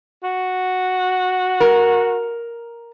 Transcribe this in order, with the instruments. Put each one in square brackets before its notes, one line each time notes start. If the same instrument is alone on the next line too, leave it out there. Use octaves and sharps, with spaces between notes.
[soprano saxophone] F#4
[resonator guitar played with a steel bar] A#4